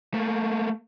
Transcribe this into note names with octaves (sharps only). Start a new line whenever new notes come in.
A3 A#3